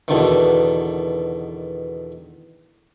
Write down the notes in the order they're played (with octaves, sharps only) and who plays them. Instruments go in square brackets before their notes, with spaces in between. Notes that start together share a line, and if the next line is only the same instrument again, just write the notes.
[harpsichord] E2 B2 D3 D#3